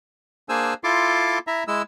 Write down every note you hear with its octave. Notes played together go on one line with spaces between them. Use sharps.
A#3 D4 G#4 C5 G#5 E6
E4 F4 A4 C6 D6
E4 E5 A#5
G#3 E4 E6